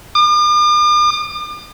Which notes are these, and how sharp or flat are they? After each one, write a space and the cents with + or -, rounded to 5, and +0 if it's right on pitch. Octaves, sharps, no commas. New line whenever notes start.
D6 +45